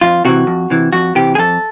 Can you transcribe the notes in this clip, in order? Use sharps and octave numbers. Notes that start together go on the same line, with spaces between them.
F2 F4
C3 E3 F#4
F2
C3 E3
F2 F#4
C3 E3 G4
G#4
F2 A4